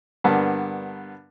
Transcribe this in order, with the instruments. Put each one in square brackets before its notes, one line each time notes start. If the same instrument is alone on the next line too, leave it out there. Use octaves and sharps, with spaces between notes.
[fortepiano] G2 D3 A#3 B3 A5